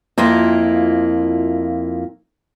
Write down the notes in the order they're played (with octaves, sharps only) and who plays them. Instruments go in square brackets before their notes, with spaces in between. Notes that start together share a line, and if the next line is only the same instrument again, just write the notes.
[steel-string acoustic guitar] F2 A#3 E4 F4